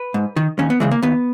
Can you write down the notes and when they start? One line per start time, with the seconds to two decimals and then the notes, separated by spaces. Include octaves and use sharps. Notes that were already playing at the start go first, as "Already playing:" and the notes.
Already playing: B4
0.14 G#2
0.36 D#3
0.59 D#2 C#4
0.70 B3
0.80 C#3 E3 G#3
0.91 A#3
1.02 D#2 B3